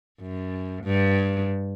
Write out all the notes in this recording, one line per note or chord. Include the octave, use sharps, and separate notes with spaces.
F#2
G2